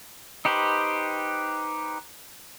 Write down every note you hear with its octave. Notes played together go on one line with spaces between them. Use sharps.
D#4 G4 B4 C5